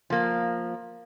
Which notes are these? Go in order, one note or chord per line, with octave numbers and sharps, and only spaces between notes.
F3 A#3